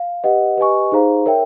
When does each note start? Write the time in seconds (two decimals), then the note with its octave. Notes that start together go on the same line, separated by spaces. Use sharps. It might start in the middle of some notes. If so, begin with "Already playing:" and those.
Already playing: F5
0.24 G4 B4 D#5 F#5
0.57 G4 B4 D#5 G#5 C#6
0.92 D#4 G#4 C5 F5 A#5
1.26 A#4 C#5 E5 G5